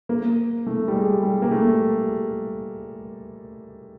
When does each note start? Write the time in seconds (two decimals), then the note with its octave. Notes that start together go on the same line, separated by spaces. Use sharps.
0.09 A#3
0.67 A3
0.88 G3
0.95 G#3
1.23 G3
1.42 A#3
1.51 A3